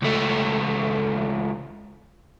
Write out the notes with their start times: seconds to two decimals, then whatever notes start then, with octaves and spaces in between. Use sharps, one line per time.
0.03 C#2 A3